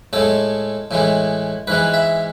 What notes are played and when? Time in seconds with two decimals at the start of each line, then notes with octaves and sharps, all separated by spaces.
0.13 A2 G#3 A4
0.91 A2 E3 G#3
1.67 G#2 E3 G#3 B4
1.94 E5